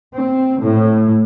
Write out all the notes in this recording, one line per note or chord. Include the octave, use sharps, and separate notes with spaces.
C4
A2